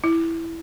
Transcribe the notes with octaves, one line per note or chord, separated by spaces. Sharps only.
E4